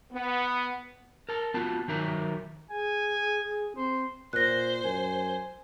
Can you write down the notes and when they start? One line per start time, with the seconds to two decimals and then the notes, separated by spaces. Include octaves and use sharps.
0.12 B3
1.29 A#4 A5
1.54 B3 F4 F#4 A5
1.88 D#3 F#3 D#4 A#4 E5 A#5
2.70 G#4 G#5
3.77 C4 C5
4.33 A#2 C5 F#6 A#6
4.84 F#2 G#5